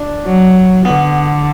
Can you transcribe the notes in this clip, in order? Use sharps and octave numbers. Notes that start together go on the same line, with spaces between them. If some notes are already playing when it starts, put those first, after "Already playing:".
Already playing: D4
F#3
D3 B3